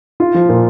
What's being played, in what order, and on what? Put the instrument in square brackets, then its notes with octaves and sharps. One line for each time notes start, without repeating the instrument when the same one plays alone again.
[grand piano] F4
F3
A#2